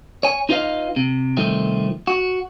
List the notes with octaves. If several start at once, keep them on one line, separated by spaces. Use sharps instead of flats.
C#5 G#5
D#4 F4 B4 D5 D#5 F5
C3
C2 D#3 F3 A3 C4
F#4